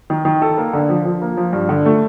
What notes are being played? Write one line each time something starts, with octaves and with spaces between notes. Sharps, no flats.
D#3
D#3
A4
A#3
D3
F3
F3
A#3
F3
G2
D3
A3